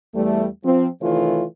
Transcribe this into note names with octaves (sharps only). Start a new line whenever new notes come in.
E2 G3 A3
F3 C4
C3 D#3 E3 A3 F4 C#5